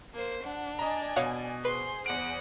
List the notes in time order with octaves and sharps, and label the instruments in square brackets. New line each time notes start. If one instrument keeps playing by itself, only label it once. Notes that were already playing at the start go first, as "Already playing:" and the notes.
[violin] A#3 C5
[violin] D4 [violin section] F#5
[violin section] D5 G#5 [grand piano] D#5 A#5
[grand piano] B2 [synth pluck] C#5 F5 F#5
[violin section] G#4 C5 [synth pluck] B4 [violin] C6
[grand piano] E2 D7 [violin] F#5